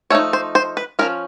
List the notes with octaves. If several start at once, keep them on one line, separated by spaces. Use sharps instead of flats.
F3 A3 D#4 C#5
C5
C5
B4
F3 G#3 C#4 A#4